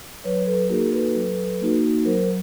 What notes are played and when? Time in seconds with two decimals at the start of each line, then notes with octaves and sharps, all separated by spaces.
0.24 F#3 B4 C#5
0.46 A4 B4
0.69 A#3 D#4 F#4 G#4 A#4
0.92 A4 B4
1.15 F#3
1.61 A#3 D#4 F#4
2.05 F#3 A#4 C5